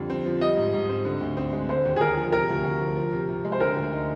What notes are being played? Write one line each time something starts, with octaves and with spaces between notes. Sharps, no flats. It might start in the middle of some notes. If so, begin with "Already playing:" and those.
Already playing: F2 D3 G3
C4
F3
G3 D#5
G#2
G#2
C4
D3
D2
C4
G#3
D3 C5
D#2
G#4
D#2 A#4
F3
C3 A#4
D2
D2
F3
F3
C3
C3
G#3
C5
D3 A#4
D2
D#4